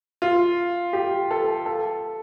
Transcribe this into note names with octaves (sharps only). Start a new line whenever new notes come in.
F4
G4
A4
A4